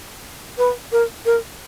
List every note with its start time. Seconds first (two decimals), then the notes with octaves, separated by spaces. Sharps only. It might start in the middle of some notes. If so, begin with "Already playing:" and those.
0.58 B4
0.92 A#4
1.26 A#4